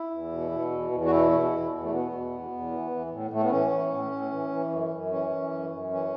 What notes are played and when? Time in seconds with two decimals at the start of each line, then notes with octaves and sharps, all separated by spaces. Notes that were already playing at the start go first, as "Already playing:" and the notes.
Already playing: E4
0.11 E2
0.31 B2
0.51 B2
0.71 E2
0.91 E2
1.05 F#4
1.10 B2 E4
1.31 B2
1.51 E2
1.72 E2
1.84 A3
1.90 B2 B3
2.11 B2
2.30 E2
2.51 E2
2.71 E3
2.90 E3
3.10 A2
3.31 A2 A3
3.43 B3
3.50 E3 C#4
3.70 E3
3.90 A2
4.11 A2
4.31 E3
4.50 E3
4.70 F#2
4.91 F#2
5.10 E3 C#4
5.30 E3
5.51 F#2
5.71 F#2
5.90 E3 C#4